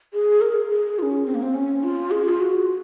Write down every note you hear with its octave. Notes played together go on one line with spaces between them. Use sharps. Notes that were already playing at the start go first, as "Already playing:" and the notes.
G#4
A#4
G#4
F4
C#4
C4
A#3
C4
C#4
F4
G#4
F4
F#4
F#4